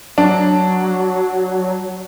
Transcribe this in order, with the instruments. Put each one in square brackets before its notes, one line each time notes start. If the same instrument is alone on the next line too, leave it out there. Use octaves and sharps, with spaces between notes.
[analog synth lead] F#3 [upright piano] D4